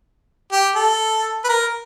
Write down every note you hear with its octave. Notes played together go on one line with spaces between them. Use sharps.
G4
A4
B4
A#4